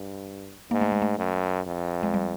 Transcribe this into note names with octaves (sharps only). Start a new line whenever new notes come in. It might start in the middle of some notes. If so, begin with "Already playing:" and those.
Already playing: G2
G#2 A#3
A3
G#3
A3
F#2
F2
G#3
G3